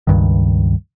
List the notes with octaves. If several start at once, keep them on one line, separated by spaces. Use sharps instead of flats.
C#2 G2 D#3